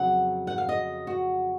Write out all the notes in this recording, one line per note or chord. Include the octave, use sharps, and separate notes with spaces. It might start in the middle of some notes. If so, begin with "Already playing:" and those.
Already playing: F2 C#3 F#3 F#5
F#5
F5
D#5
F#4